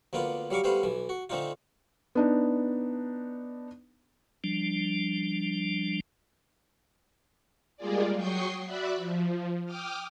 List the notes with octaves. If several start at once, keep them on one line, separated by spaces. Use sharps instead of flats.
D2 A#3 B3 F4 D5
F#3 G3 F5 C#6 D6
G3 A3 B3 C5 F5
B1 E3
F#4
D3 A3 C4 D4 D#4 F4
B3 D4 D#4
F3 G3 D4
G3 G#3 A#3 F4 G#4 D5
F#3 G5 C#6 D#6 G6 C7
F#4 D5 E5 F#5 B5
F3
G5 D6 D#6 F6